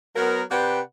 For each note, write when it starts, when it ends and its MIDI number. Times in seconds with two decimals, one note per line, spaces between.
0.16 0.42 54
0.16 0.42 59
0.16 0.42 70
0.51 0.80 48
0.51 0.80 71
0.51 0.80 74
0.51 0.80 78
0.51 0.80 79